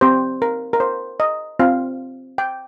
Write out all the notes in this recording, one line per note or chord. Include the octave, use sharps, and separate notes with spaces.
C4 G4 C5
A#4
A#4
C5
D#5
C4 F4 F5
G5